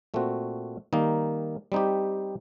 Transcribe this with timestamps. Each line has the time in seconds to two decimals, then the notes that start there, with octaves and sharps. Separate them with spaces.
0.14 A#2 A3 C4 F#4
0.93 D#3 G3 A#3 D#4
1.72 G3 C4 D#4 G4